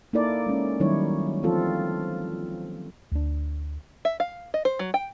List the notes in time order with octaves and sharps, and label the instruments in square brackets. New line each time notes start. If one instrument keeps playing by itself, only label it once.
[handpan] A#3 D#4 E4 A4 A#4 D5
G#3 C#4
D#3 F#3 G3 D#4 E4 C#5
E3 F3 C4 F4 A4
[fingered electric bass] D2 D4
[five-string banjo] E5
F5
D#5
C5
F#3
G5